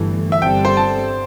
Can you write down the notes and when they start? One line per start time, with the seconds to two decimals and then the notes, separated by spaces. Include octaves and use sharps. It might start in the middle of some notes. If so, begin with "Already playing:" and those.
Already playing: G1 G2 E3 A3
0.32 E5
0.42 G1 G2 G3 C4 A4 G5
0.65 C5
0.77 A5